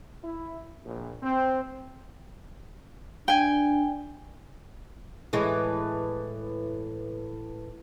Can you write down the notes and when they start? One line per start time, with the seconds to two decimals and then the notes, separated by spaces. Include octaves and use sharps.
0.22 E4
0.84 A#1
1.22 C4
3.28 D4 G5 G#5
5.33 A2 E3 G#3